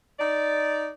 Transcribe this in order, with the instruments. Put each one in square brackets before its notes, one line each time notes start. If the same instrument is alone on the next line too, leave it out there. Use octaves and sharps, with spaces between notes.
[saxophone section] D#4 D5